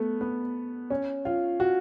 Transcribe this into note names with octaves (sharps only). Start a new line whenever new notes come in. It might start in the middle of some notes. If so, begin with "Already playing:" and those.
Already playing: A3 B3
B3
C#4
F4
F#4